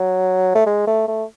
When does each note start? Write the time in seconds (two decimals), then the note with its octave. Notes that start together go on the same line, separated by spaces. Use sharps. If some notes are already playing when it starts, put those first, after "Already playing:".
Already playing: F#3
0.55 A3
0.66 G#3
0.87 A3
1.08 A3